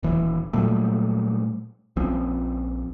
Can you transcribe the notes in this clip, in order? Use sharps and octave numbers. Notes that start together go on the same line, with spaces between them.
D#1 E3
A#2 F#3 G3 A3
A#1 F3 C4 C#4